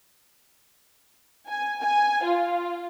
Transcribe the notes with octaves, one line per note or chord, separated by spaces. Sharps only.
G#5
G#5
F4